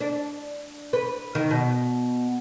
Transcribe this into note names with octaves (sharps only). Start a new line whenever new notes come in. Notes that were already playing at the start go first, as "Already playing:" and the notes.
D4
B4
D#3
B2